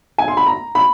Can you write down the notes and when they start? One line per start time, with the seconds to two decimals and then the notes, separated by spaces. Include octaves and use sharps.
0.18 G#5
0.28 C6
0.37 B5
0.47 A#5
0.75 B5